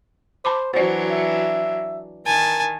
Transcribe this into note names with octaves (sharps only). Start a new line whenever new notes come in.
C5 A5 B5 D6
E3 F#3 D4 F#4 C5 D5
E5
D#3 A#4 G#5 A5